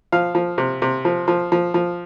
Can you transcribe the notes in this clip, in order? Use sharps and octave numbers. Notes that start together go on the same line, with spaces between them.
F3 F5
F3
C3
C3
F3
F3
F3
F3